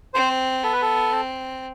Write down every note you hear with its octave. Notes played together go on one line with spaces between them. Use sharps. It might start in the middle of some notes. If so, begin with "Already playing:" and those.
C4 C5
B3 A4
B4
A4
C4